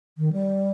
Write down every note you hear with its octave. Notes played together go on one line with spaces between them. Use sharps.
D#3
G3